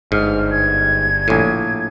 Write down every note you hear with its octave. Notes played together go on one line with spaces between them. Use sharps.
G1 G#2 F6
G#6
A#1 A2